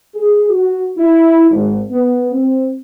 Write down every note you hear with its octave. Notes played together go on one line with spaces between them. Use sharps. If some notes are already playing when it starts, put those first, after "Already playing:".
G#4
F#4
E4
G#1
B3
C4